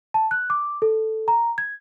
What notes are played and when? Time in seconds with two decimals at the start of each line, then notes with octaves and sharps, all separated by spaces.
0.14 A5
0.31 F#6
0.50 D6
0.82 A4
1.28 A#5
1.58 G#6